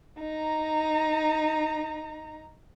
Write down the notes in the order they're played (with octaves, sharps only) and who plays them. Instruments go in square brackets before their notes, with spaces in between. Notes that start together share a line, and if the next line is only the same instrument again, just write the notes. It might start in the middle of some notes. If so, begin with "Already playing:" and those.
[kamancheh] D#4 A#5